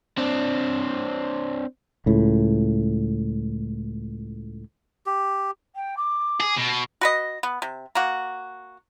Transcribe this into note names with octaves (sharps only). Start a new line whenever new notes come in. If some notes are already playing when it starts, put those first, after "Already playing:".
C4 D4
C#2 A2
G4
G5
D6
G#4
B2
F#4 B4 D#5
B3
C3
A#3 F#4